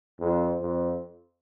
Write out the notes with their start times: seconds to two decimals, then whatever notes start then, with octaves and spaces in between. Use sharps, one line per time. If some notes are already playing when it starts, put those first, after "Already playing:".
0.20 F2
0.61 F2